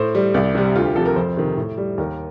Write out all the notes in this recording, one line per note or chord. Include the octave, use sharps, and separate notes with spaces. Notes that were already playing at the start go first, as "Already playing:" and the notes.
Already playing: A2 C5
G3
C2 D5
C3 G3
D2 F4
G4
C3 F3 A4
A#4
F2 C5
C3 D#3
A2
G3
D#2 A#4